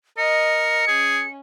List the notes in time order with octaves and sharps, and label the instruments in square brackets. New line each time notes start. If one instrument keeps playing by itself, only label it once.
[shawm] A#4 [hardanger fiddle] D#5 [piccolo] C#7
[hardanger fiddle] C#4 [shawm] G#4